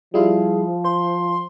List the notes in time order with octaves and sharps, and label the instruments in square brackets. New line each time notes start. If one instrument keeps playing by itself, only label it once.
[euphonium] F3 [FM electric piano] G3 E4 F4 [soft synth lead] G#4
[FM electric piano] C5 [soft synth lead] C6